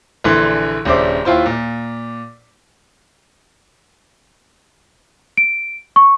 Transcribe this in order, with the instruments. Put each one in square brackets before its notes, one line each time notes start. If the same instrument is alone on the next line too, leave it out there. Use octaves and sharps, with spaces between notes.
[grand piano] A#1 D3 E3 C6
D#1 C#3 D4 C5 E5 D6
D#2 E4 F4 C5
A#2
[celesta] D7
C#6